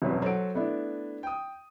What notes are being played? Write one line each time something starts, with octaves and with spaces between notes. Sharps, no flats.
E1 C2 F#2 F#3 G3 B4
F#3 F#4 A4 C5 F#5 D7
A3 B3 D4 E4
G5 D#6